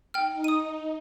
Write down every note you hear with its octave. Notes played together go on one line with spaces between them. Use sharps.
D#4 G5 F6
D#6 D#7